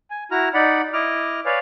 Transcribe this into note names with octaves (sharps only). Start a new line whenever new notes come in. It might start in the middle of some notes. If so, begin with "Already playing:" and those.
G#5
E4 F#4 A#5 F6
D#4 D5 F#5 B5
E4 D#5 D6 F6
B4 C#5 D5 F5 G#5